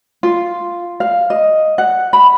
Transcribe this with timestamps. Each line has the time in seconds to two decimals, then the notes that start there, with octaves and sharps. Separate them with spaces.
0.23 F4
1.00 F5
1.30 D#5
1.78 F#5
2.13 B5